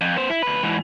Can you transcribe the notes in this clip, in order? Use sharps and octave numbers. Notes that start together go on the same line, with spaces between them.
F2
B3 C5
E4
D2 B4
G#2 E3